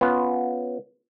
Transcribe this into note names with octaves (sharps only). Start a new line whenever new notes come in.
B3 C#4 F4